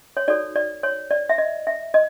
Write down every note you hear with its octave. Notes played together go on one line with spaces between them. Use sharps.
C#5
D#4 F#4 A4 C#5 D5
D5
C#5
D5
E5
D#5
E5
D#5